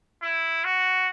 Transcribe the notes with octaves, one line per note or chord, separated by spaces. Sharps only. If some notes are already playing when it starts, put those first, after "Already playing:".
E4
F#4